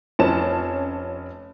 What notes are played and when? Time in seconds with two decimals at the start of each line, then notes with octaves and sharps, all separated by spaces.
0.19 F1 F3 C#4 A5 E7